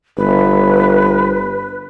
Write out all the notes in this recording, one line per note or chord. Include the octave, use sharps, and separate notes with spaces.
G1 B4